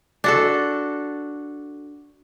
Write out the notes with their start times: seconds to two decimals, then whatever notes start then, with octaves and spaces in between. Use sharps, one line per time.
0.24 D4 F#4 A4